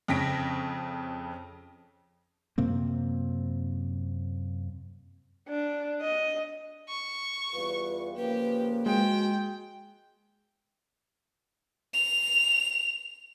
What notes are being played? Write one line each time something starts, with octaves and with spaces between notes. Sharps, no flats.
F2 C#3 A#6 B6 D7
F#2 C3 A#3 C4
D4
D#5
C#6
E2 G3 F4 B4
C#3 F3 A#3 G4 B4
G#3 F#4 G5
F7